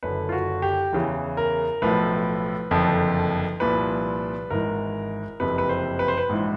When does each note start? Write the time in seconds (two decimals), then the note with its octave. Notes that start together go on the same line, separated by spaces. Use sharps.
0.03 F#1 F#2 D3 B4
0.29 F4
0.32 F#4
0.62 G4
0.93 E2 C#3 E3
1.37 A#4
1.82 B1 A2 F3 B4
2.71 F#1 F2 D3 F3
3.60 C2 A#2 F3 B4
4.50 G#1 G#2 E3 A#4
5.40 F#1 F2 C3 B4
5.58 B4
5.69 C5
5.99 B4
6.08 C5
6.18 B4
6.29 A#1 G#2 E3